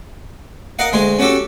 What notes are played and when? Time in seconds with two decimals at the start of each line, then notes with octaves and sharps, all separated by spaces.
0.79 A#4 D#5 F5 F#5
0.93 D2 G#3 G#5 C6
1.19 C#4 F#4 G4 A4